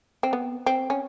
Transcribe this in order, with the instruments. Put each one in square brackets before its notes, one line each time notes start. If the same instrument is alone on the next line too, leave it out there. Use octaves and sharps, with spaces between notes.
[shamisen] C4
B3
C4
C#4